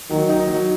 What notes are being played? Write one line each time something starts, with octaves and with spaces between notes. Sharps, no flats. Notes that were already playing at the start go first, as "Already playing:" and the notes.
D#3 F#3
D#4
F#3